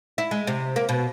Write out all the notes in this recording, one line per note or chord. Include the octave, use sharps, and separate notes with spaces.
E4
G#3
C3
A#3
B2